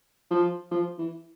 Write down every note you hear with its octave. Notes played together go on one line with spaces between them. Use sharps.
F3
F3
E3